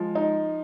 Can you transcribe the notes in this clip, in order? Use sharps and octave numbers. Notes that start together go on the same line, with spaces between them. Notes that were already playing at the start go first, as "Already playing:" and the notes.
Already playing: F3 G#3
D#4